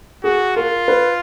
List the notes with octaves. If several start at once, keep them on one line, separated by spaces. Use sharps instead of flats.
F#4 G#4
F4 A#4
B4